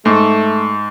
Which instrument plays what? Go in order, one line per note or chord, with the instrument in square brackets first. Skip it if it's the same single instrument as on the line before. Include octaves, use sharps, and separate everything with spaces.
[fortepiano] G#2 [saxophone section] A3